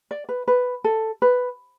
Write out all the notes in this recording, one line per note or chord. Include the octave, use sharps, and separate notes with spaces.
D5
B4
B4
A4
B4